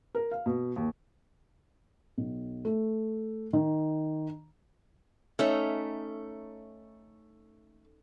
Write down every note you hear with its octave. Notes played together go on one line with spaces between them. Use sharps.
A#4
F5
B2
D#2
B1
A3
D#3
A3 C#4 D#4 E5